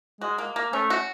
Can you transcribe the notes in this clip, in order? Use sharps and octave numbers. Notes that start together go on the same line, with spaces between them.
G#3 F#4
A#3
A#3
A3 C#4
F#4